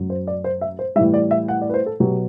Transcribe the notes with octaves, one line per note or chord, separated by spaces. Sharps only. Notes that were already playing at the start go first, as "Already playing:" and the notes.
Already playing: F#2 F#3
C5
D5
C5
E5
C5
A2 E3 G3 E5
D5
E5
F#5
D5
B4
C5
A4
B2 F#3 G4